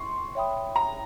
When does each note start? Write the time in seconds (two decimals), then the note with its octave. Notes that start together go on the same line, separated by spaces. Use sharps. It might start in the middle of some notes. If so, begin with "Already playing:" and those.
Already playing: C6 C#6
0.35 C#5 E5 G5 B5 D#6
0.76 A#5